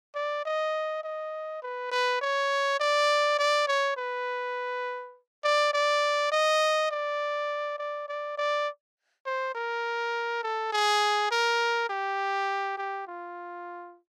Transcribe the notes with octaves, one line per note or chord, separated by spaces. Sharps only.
D5
D#5
D#5
B4
B4
C#5
D5
D5
C#5
B4
D5
D5
D#5
D5
D5
D5
D5
C5
A#4
A4
G#4
A#4
G4
G4
F4